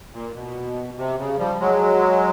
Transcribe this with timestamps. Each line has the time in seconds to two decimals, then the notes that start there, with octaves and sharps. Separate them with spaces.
0.13 A#2
0.34 B2
0.97 C3
1.18 C#3
1.38 F3 G3
1.60 F#3 G#3